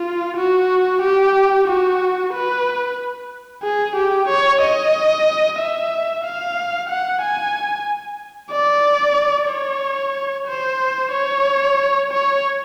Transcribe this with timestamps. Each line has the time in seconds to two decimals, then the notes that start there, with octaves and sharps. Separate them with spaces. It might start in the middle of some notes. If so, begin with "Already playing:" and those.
Already playing: F4
0.37 F#4
1.02 G4
1.68 F#4
2.34 B4
3.63 G#4
3.96 G4
4.29 C#5
4.62 D#5
5.59 E5
6.24 F5
6.89 F#5
7.21 G#5
8.52 D5
9.49 C#5
10.48 C5
11.12 C#5
12.11 C#5